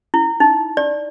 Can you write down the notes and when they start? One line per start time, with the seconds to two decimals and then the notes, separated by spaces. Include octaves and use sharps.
0.14 E4
0.40 D#4
0.77 D5